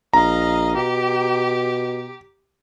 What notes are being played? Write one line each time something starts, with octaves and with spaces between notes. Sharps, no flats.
A#1 D#5 F5 A#5
B2 G4